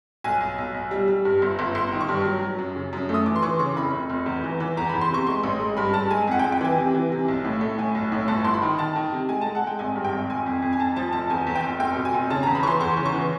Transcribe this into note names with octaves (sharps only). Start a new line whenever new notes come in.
B1 G#5
B1
B1
B1
G3
G3
G2
G1
G1
G1 C6
D#3
C#6
G2
F#3
F#3
F#2
C#3
F#2
A3
D#6
E3 D6
C6
E3 C#6
C#3 C#6
F1 B5
F1
F1
E2
E3
E3
E2 A#5
E2 B5
C6
C3 C#6
G#3 C6
A1
G#3
G2 B5
G2 A5
G#3 G#5
F2 F#5
G5
F2
G5
E3 G#5
C3
E3
C3
B1
A2
A3
A2 G#5
B1
A2
G1 A5
G1 C6
B5
D#3
D#3 A5
D#3
C3
G#3 G#5
G#3 A5
F#5
G#3 G5
G#1 G#5
G2
G5
G#1
F1 G#5
F2
F2
G#5
F2 A5
F3 A5
F1 A5
E2 G#5
E2
G5
F1
F1 G5
B2
G#5
F1
C#3 A5
E2 A#5
B5
E3 C6 C#6
E2 C#6
C#3
C#6
E3